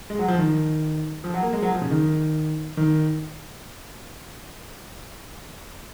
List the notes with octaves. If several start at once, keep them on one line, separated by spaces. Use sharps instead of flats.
G#3
F#3
F3
D#3
F3
F#3
A#3
G#3
F#3
F3
C#3
D#3
D#3